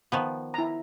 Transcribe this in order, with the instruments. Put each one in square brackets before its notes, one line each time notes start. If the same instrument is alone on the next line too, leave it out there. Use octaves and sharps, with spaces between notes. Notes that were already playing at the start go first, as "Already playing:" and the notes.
[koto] D#3 F3 B3
[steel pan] E4 A#5